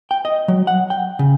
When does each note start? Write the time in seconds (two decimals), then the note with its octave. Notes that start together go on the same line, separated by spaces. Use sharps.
0.11 G5
0.25 D#5
0.48 F#3
0.67 F#5
0.90 G5
1.19 C#3